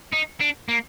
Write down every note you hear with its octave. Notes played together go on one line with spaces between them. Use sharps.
D#4
D4
A#3